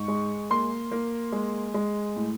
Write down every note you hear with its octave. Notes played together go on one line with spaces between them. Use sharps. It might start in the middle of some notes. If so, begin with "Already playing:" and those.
Already playing: G#2 C#6
G#3
A#3 C6
A#3
G#3
G#3
A2